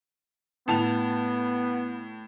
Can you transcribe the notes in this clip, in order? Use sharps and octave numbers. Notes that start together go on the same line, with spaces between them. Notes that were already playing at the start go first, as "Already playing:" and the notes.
A2 B3 A5 F7